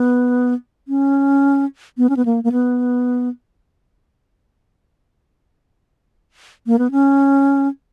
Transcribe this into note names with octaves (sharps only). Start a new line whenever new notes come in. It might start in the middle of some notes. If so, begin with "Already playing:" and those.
Already playing: B3
C#4
B3
C#4
B3
A#3
A#3
B3
A#3
B3
C#4